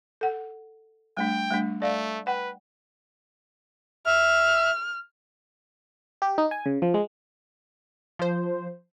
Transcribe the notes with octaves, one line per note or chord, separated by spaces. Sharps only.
A4 F#5
G3 A3 D4 G5
G3 A3 D4
A3 D5 F5
B4 F#5 G5
E5 F6
G4
D#4
G#5
C#3
F3
G#3
F3 C5